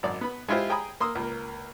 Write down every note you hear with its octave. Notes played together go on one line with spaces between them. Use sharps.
G#1 F#2 D5
B3 B5
G#3 E4 F4 G4 C5
G#4 G5 G#5 A#5 B5 D#6
A#3 C6 D#6 E6
C#2 A#3